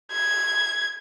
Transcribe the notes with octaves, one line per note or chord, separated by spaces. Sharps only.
G#6